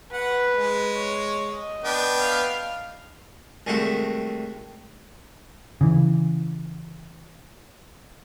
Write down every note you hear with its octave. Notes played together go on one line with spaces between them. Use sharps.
B4 F#5
G#3
C#5
D#5
B3 D4 G5
F5
C2 D#3 G#3 A3 F#4 F#5
C#3 E3